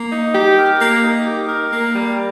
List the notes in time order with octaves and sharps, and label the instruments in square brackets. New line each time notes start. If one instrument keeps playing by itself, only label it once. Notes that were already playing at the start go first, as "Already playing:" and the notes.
Already playing: [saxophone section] A#3
D#4
G4
A#4
A#3
D#4
G4
A#4
A#3
G3